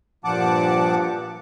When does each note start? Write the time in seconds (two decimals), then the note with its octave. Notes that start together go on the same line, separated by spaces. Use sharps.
0.24 G2 A#2 F3 F#5 A5 D6